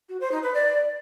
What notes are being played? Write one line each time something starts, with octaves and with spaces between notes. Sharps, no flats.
F#4
C5
D#4
B4
D5